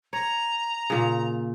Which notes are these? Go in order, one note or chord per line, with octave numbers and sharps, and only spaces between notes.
C#5 A#5
A#2 C#3